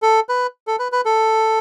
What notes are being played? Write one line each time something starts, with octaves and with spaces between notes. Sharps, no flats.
A4
B4
A4
B4
B4
A4